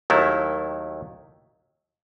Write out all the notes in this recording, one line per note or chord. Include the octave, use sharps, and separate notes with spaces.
D#2 D#3 F#3 A3 E4